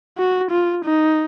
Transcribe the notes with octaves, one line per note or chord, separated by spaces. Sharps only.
F#4
F4
D#4